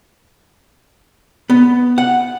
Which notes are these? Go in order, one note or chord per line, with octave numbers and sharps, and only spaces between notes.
B3
F#5